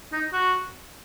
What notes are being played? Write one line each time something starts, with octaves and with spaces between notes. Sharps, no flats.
D#4
F#4